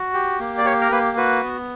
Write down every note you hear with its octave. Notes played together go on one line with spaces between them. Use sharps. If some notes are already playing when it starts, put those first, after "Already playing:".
Already playing: F#4
G4
A#3
D5
G4 C#5
A#4
A#3 B4
F#4 B4
B3